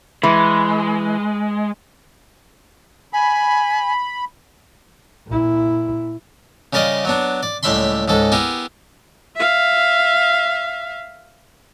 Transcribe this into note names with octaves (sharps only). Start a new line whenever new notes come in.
E3 G#3
G#5 B5
A#2 E4
C#3 G3 A#4 D5 D#5 F5
F#3 B3 D4
D5
C#2 A2 G3 E5 B5 C6
C#2 G#2 G#3 A4
B3 E4 G4 G#4 A#4
E5 F5